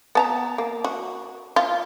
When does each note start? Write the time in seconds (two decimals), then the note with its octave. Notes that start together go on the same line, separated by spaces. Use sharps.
0.15 B3 A5 A#5
0.58 A#3
0.84 F#4
1.56 F4